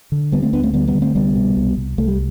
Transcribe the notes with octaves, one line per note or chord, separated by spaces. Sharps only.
D3
D2 G3 B3
A3 C4
D2 B3 D4
A3 C4
D3 G3 B3
G3 B3
D3
A3 C4
C2 G3 B3
B2
C2
C2
C2 A3
G3